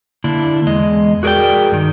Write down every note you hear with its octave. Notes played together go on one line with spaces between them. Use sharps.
D3 A#3 D4 E4
E2 G#3 D#5
F#4 G#4 A#4 B4 D5 G5
G2 D#3